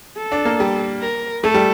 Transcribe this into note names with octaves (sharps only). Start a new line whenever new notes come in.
A4
D4
A#3
G3
A#4
A3 A4
G3